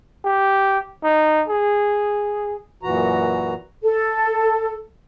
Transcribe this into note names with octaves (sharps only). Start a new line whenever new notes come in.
G4
D#4
G#4
F#2 A#2 E3 F#4 A#5
A4